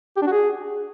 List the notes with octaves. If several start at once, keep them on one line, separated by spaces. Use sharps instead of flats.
G4
D4
F#4
G#4